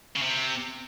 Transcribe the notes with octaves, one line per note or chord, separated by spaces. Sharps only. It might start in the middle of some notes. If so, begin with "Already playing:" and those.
C#3
C3